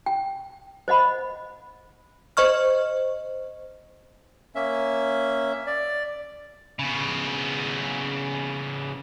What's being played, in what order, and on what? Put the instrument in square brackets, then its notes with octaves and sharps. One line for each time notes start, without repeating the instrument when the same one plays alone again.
[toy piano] G5
C5 D#5 F#5 B5
[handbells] C5 D#5 C#6 F6
[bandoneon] A#3 C#4 E5
D5
[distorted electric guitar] C#3 B3